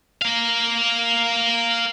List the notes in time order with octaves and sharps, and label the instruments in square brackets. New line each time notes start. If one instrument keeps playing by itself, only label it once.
[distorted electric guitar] A#4 F5